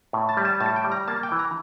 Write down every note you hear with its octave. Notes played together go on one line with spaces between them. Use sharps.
A2
A5
G3
A5
A2 A5
G5
G3
A#5
A#3 A5
G5
E3
A#5